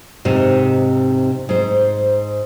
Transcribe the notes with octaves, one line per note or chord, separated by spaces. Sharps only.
G#2 C3 D#4
G#2 C5